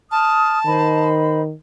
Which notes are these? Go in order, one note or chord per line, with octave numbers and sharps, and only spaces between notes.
A5 D#6 F6
D#3 C5 D#5 B5